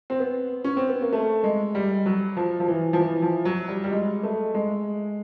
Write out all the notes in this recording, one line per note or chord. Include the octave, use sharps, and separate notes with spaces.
C4
B3
C#4
C4
B3
A#3
A3
G#3
G3
F#3
F3
F3
E3
F3
E3
F3
F#3
G3
G3
G#3
A3
G#3